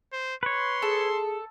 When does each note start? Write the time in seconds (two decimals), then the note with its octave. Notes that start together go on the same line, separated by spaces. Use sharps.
0.12 C5
0.43 B4 C#5 C6
0.82 G#4 A4